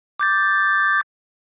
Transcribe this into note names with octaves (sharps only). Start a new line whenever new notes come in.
D6 G6 A6